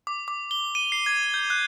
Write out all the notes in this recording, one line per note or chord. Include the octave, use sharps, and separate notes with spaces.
D6
D6
G7
D#7
C7
G#6
G6
F#6